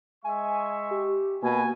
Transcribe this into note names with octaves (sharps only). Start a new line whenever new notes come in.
G#3 E5 G#5 C#6
G4
B2 A#3 G#5